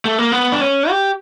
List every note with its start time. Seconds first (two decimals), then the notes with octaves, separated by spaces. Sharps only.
0.05 A3
0.18 A#3
0.32 B3
0.52 D4
0.61 C#4
0.90 G4